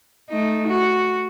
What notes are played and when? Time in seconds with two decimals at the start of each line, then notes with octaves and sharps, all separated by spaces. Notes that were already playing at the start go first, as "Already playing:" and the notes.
0.30 A3 D#4
0.68 F#4